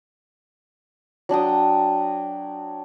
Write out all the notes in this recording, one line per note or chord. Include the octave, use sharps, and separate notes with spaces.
F#3 D4 G5 D#6